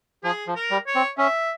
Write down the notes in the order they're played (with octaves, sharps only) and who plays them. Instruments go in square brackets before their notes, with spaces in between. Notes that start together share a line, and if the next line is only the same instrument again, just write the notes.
[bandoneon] F3 [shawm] G#4
[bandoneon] F3
[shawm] A#4
[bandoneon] G3
[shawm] C#5
[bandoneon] C4
[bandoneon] C#4 [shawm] E5